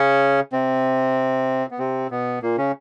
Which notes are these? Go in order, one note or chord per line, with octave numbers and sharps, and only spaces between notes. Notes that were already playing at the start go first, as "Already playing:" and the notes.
Already playing: C#3 C#4
C3 C4
B3
C3 C4
B2 B3
A#2 A#3
C#3 C#4